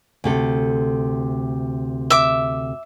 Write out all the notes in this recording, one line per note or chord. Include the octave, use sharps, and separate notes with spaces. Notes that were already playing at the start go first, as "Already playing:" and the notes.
D2 C3 A4
E5 D6